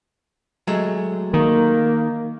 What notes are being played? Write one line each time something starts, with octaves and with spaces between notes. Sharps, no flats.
F#3 G#3 A3
D#3 A#3